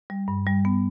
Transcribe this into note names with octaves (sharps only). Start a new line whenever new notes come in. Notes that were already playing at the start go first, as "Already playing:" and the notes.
G3
G2
G3
B3